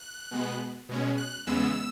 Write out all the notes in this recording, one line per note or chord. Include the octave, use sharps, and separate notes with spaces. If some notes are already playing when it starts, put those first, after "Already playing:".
Already playing: F#6
B2 G#3 B3
B2 G#3 C#4
F#6
E2 C#3 G#3 B3 E6